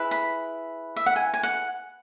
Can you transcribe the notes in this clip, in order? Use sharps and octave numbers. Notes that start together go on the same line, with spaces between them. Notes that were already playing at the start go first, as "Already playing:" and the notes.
Already playing: E4 G#4 B4
B5
E5
F#5
G#5
G#5
F#5